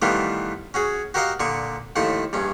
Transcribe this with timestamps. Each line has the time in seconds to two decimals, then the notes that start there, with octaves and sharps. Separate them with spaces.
0.02 D#3 E3 G3 A3 B3 F4
0.74 C#4 F#4 G#4
1.14 F#4 G4 A#4 D#5 F5 F#5
1.40 A#2 D3 C#6 D#6
1.96 D#2 A2 F3 A3 A5
2.33 A#1 G2 C#4